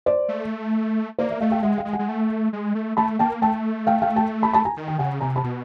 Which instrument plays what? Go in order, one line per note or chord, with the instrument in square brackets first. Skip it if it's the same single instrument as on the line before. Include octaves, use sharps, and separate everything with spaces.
[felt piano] C5 D5
[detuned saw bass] A3
[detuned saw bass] A#3 [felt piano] C5 D5
[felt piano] D5 E5
[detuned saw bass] A3 [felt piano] D#5 F5
[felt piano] F5 G5
[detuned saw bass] G#3 [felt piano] E5 F#5
[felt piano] F5 G5
[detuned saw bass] G#3
[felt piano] F#5 G#5
[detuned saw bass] G#3
A3
G#3
A3
[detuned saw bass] A3 [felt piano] A5 B5
[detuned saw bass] A#3 [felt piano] G5 A5
[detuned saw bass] A3 [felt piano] G5 A5
[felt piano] F5 G5
F5 G5
G5 A5
A5 B5
A5 B5
G#5 A#5
[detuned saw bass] D#3
[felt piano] G5
[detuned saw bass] C#3 [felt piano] F#5 G#5
[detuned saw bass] C3 [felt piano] G#5 A#5
[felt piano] A5 B5
[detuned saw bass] B2